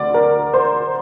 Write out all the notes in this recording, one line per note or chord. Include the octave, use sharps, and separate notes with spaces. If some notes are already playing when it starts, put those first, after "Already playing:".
Already playing: D2 D5
A#4
C5